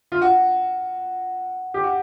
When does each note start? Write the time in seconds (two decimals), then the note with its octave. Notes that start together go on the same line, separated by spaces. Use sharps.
0.12 F4
0.22 F#4
1.74 G4
1.84 F#4